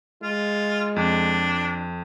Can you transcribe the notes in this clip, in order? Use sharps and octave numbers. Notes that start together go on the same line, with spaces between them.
G#3 F4
F2 D4